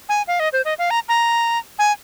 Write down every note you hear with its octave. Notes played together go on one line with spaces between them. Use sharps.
G#5
F5
D#5
C5
D#5
F5
A#5
A#5
G#5